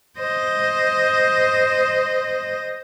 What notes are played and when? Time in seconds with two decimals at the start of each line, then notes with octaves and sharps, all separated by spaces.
0.18 C5 D#5